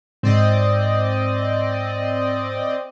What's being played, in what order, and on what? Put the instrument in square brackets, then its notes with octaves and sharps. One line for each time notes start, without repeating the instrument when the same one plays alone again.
[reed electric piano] G#2 [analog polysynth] C4 D5 D#5